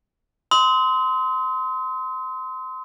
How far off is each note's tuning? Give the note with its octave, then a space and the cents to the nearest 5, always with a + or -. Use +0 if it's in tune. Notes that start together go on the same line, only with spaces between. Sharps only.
C6 -20 D#6 +45